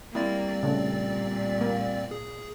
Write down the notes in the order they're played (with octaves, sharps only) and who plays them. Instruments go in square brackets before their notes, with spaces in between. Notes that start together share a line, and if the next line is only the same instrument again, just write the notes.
[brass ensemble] G3 [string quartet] A#3 [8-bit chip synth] C4 D5 A6 [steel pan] E4
[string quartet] A#2 [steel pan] C#3 A3
[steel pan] A#3
[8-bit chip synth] G#4